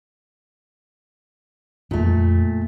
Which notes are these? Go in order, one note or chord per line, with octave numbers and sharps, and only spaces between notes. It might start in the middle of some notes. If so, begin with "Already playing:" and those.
F2 A#2 A3 A#3